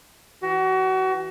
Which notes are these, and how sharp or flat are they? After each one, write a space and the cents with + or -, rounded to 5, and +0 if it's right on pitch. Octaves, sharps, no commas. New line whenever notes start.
E3 +0 F#4 +30